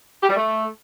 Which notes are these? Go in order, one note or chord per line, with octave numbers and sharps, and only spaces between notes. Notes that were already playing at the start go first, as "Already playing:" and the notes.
G4
G3
A3